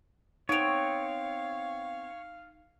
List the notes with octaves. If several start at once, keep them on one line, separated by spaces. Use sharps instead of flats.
B3 C4 D#4 C#5 F5 D7 F7